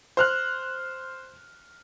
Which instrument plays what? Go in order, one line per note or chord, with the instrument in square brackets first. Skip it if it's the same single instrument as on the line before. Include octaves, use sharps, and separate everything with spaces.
[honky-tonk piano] C5 F6 F#6